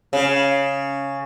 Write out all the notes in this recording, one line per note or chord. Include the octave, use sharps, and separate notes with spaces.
C#3